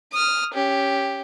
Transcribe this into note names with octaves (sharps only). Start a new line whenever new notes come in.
D#6 F6
C#4 G4